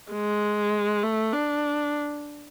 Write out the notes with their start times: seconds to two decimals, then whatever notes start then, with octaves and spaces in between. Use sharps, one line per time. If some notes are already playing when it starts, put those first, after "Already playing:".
0.12 G#3
1.03 A3
1.33 D4